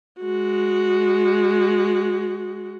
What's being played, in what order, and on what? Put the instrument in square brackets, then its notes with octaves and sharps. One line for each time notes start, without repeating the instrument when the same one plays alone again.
[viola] G#3 F#4